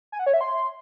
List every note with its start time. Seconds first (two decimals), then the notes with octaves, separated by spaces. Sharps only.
0.12 G#5
0.19 F#5
0.26 C#5
0.34 E5
0.41 C6